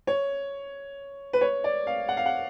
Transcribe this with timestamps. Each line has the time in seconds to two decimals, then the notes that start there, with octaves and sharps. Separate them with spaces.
0.07 C#5
1.33 B4
1.41 C#5
1.64 D5
1.87 F5
2.09 F#5
2.17 F5
2.26 F#5